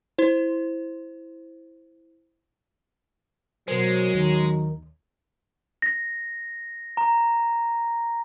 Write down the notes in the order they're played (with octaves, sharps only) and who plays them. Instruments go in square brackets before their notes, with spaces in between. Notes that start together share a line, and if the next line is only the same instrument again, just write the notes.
[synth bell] E4 C5
[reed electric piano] B2 A#4 C5 [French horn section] F#3 [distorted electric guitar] G#3
[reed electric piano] D#2 [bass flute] D#3
[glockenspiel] A#6
A#5